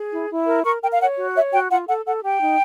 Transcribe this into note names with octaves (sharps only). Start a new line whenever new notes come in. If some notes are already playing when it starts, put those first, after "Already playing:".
Already playing: G#4
E4
E4
A#4
A#4 C#6
A#4 G5
F5
C#5 F#5
F#4
C#5 E5
F#4 G5
F4 F#5
A4 F#5
A4 F#5
G4 G5
D#4